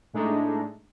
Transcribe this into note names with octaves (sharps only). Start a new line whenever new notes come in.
A2 G#3 A3 D4 D#4